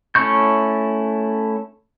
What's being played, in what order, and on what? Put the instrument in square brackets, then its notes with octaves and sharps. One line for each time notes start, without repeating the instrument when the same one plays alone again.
[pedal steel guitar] A3 C#4 E4 C#6 G6